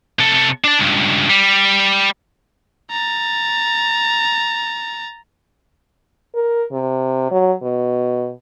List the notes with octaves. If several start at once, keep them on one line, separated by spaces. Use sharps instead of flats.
C3 A4
D4 A5
C#2 G2
G3
A#5 A6
A#4
C3
F#3
B2